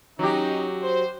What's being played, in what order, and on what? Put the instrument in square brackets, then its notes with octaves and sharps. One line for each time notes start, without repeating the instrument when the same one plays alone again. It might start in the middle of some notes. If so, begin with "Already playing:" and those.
[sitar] F#3 G4 [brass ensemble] C#4 D#4
[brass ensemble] C5